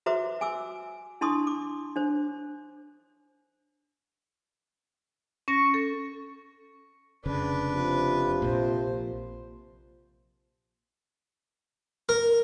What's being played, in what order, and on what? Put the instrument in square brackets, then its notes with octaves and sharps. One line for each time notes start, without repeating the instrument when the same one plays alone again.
[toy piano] F#4 B4 C5 E5 A#5 D6
G#5 D6 E6
D4 E4 A5 C6 C#6 D#6
D6
D4 C5
[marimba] C#4 A#6 [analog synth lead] C#6
[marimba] A4
[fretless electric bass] F1 C#3 [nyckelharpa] D4 B4
[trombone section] C3 F3
[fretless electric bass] A#1 A#2 [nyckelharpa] C5
[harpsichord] A#4